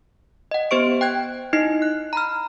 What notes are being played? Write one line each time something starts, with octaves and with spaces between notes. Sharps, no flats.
D#5 F#5
B3 G4 C5 C#6 D7
G5 F#6 G#6
D#4 E4 D#5 C7
F#6
A#5 B5 F6